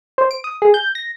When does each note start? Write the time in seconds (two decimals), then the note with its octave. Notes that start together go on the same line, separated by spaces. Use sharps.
0.18 C5
0.31 D7
0.44 D#6
0.62 G#4
0.74 G6
0.95 A#6